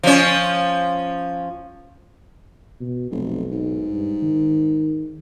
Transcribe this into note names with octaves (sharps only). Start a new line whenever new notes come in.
F3 C#4
B2
F1 B1
G#2
G2
D#3